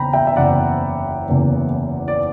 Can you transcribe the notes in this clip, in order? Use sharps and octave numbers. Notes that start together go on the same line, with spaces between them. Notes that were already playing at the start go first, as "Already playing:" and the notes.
Already playing: F#1 E2 C#3 G5 A#5 B5
E5 G5
E5
F#1 E2 C#3 D5 F#5
F#1 E2 C#3
D5